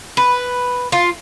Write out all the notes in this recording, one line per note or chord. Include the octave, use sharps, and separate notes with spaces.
B4
F4